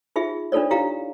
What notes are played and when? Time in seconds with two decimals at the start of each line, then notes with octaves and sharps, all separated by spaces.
0.16 D#4 F4 G#4 E5
0.52 D4 D#4 F4 A4 C#5 D5
0.71 E4 G4 F5 A#5